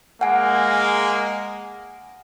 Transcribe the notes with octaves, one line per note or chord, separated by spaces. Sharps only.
G#3 A#3 F#5 G#5